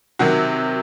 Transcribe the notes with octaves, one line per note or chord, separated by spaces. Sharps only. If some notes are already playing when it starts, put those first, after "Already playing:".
C3 D#3 F#3 F#4